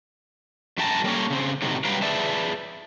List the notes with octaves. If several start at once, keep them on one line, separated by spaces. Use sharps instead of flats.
F#2 A3 F#4 G5 A5 A#5
G3 A#3 C#4 A4 A#4 C#5
C#3 C4
A2 C3 D#3 F#3
F#3 G3 B4 F5 G5 A#5
G#4 B4 D5 E5 A5